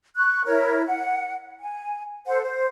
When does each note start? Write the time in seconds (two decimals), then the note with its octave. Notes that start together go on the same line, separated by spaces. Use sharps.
0.17 C#6 F#6
0.46 E4 A#4 C#5
0.86 F#5
1.60 G#5
2.27 A4 C5 F#5
2.43 C5